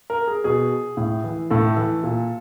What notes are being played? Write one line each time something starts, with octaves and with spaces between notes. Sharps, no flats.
A#4
G#4
B2 G#4
A2
E3
A2 A4
E3
A#2